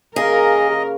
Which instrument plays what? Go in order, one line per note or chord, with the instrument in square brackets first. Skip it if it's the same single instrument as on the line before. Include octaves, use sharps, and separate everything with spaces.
[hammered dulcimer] C#3 A#3 [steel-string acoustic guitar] G#4 [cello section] A#4 [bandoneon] D#5